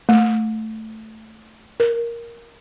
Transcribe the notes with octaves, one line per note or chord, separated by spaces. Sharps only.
A3
A#4